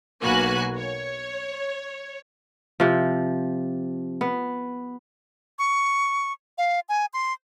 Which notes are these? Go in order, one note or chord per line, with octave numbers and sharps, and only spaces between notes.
B1 A#3 F#4 B4 G#5 F#6
C#5
C3 F3
B3
C#6
F5
G#5
C6